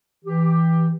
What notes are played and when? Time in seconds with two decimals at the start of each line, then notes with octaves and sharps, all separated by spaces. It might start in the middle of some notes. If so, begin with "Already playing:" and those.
0.25 E3 G4